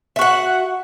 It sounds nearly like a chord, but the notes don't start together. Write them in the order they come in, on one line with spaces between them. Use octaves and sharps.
E5 F#4 F#5